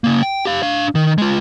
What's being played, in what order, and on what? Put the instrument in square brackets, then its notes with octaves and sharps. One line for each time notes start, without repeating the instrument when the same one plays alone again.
[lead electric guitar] C#3 A#3
G5
G4 F5
D4 F5
D#3
G#3 F4